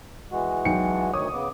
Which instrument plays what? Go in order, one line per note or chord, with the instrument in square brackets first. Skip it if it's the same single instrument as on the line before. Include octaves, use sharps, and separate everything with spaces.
[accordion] E3 G#3 F#4
[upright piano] B1 G5 C#7
[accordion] D2 D#3 C#5 [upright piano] D#6
[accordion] C#3 B3 D6